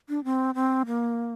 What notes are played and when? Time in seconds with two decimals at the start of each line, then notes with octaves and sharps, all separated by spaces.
0.09 D4
0.24 C4
0.55 C4
0.87 A#3